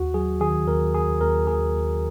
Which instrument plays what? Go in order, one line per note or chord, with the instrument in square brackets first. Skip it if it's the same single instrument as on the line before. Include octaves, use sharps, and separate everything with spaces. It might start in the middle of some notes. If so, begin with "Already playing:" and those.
Already playing: [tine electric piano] D#2 F#4
F#3 G#4
D#3 G#4
D#2 A#4
D#2 G#4
D#2 A#4
D#2 G#4
D#2